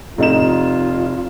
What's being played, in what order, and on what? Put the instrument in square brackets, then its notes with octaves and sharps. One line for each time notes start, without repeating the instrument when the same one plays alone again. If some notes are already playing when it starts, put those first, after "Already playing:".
[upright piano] F1 D#4 E7 [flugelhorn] F4